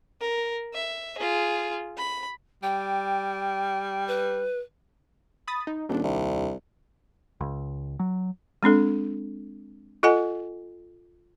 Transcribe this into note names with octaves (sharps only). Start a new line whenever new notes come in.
A#4
E5
F4 G#4
B5
G3 G5
B4
B5 D#6 A6
D#4
D#1 D#2 D4
C2
C#2
F#3
G#3 C4 D4 A4
F4 A4 D#5 F#5 G#5